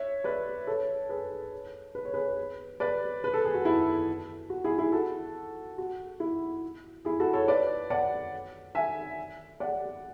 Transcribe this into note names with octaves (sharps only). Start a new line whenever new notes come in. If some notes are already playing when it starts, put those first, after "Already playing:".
Already playing: C#5 E5
B4 D5
A4 C#5
G#4 B4
B4
C#5
G#4 B4
B4 D5
B4
A4
G#4
F#4
E4
F#4
E4 G#4
E4 G#4
F#4 A4
F#4
E4
E4 G#4
F#4 A4
A4 C#5
B4 D5
D5 F#5
E5 G#5
D5 F#5